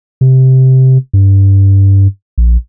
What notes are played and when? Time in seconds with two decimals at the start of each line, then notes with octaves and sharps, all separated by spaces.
0.21 C3
1.13 G2
2.38 A#1